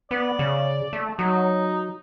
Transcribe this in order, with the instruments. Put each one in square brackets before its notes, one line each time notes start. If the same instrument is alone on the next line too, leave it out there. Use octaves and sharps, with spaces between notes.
[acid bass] B3 [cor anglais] D5
[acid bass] C#3
A3
[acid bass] F#3 [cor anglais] D#4